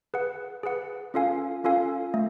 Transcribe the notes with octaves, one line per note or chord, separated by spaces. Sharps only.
G#4 B4 F#5
G#4 B4 F#5
C#4 F4 A4 F5 G#5
C#4 F4 A4 F5 G#5
A3